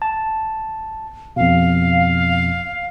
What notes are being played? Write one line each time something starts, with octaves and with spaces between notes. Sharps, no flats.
A5
F2 B2 F5